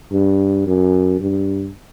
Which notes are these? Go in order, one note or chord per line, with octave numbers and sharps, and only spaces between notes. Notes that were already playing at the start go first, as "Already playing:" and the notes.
G2
F#2
G2